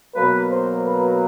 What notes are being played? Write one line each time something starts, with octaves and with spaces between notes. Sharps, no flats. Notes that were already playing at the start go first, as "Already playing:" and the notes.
B2 F#3 A#3 B4
C5
B4